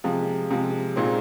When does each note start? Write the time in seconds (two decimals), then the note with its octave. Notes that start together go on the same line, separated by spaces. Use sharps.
0.04 C3 F3 G#3
0.51 C3 F3 G#3
0.96 A#2 G#3 C4 D#4